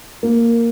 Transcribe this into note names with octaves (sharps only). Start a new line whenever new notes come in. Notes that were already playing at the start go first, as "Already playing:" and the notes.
A#3